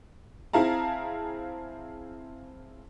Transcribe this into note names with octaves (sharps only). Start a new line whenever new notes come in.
C4 E4 G#4 F5 A5 A#5